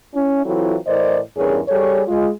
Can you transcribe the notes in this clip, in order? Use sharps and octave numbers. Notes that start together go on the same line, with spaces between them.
C#4 E4
E3 F#3 C4 E4 F4 A4
A2 E3 A#4 C5 D5 D#5
E2 G2 C#4 G#4 A#4 C#5
G3 G#4 A4 C#5
G#3 F4